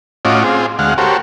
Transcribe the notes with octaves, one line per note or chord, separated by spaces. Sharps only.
A2 C#4 F4 F#4 D#5 D6
C4 F4 G#4
D2 G#3 F5 F#5
F#4 G4 A4 A#4 C5 C#5